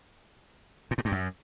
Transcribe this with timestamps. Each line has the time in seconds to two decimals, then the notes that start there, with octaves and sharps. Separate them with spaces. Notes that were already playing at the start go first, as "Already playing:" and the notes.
0.91 A#2
0.98 A2
1.05 G2
1.12 F#2